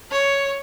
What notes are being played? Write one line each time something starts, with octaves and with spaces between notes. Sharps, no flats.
C#5